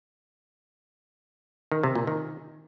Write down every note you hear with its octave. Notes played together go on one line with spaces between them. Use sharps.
D#3
C3
A#2
D#3